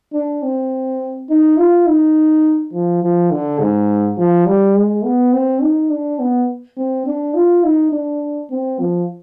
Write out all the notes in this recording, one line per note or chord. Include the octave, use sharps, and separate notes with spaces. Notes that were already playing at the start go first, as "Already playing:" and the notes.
D4
C4
D#4
F4
D#4
F3
F3
D3
G#2
F3
G3
G#3
B3
C4
D#4
D4
B3
C4
D4
F4
D#4
D4
C4
F3